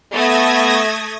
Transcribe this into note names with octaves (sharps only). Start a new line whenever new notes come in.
A3 B3 D#6 G#6 A#6